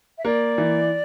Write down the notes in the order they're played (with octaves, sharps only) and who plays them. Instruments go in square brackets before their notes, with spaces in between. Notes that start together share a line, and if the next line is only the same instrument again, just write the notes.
[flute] E5
[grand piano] A#3 [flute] D5
[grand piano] E3